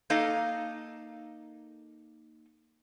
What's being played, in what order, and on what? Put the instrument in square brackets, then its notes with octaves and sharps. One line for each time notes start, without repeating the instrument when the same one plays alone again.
[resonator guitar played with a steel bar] A#3 D#4 A4 D#5 F5